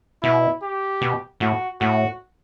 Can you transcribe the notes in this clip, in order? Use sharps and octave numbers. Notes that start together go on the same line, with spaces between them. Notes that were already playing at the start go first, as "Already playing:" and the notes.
B2 E4
G4
B2
A2 F#4
A2 F#4